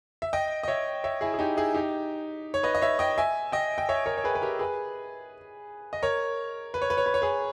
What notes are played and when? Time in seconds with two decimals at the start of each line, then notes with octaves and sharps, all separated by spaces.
0.22 E5
0.33 D#5 G5
0.63 D#5
0.68 C#5 E5
1.04 C#5 E5
1.21 E4 G#4
1.34 G#4
1.39 D#4 G4
1.57 E4 G#4
1.74 D#4 G4
2.54 C#5
2.63 B4 D#5
2.75 D#5
2.82 C#5 E5
2.99 D#5 G5
3.18 E5 G#5
3.52 D#5 G5
3.78 G5
3.89 C#5 E5
4.06 A#4 C#5
4.17 C#5
4.24 G#4 B4
4.35 B4
4.41 G4 A#4
4.59 G#4 B4
5.93 D#5
6.02 A#4 C#5
6.74 B4
6.82 C#5
6.90 B4
6.97 C#5
7.06 B4
7.14 C#5
7.22 G#4 B4